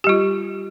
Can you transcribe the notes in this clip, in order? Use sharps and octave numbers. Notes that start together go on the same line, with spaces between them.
G3 F4 G4